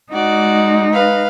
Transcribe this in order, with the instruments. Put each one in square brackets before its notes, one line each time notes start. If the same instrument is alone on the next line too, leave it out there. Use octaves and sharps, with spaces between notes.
[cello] G#3 D#4 [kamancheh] F#4 D5
[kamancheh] B4 F5